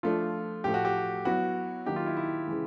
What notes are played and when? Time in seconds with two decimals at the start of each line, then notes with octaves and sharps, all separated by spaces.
0.03 F3 A3 D4 F4
0.64 A2 F3 A3 G4
0.74 F#4
0.85 G4
1.25 F#3 B3 E4 F#4
1.86 D#3 F#3 A#3 D#4 G4
1.96 F4
2.06 E4
2.17 E4
2.47 C#3 E3 G#3